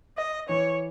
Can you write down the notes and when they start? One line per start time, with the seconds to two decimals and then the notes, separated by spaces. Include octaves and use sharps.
0.18 D#5
0.49 E3 C#5